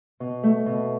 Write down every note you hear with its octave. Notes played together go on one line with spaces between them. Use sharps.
B2
A3
B2